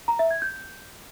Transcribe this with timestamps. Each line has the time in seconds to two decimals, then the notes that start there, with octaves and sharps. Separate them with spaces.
0.08 A#5
0.19 E5
0.31 G#6
0.42 G6